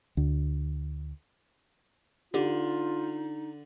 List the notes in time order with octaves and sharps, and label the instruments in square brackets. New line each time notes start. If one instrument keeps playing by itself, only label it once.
[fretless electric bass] D2
[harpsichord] D3 [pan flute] D#4 [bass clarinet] F4 [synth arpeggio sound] G4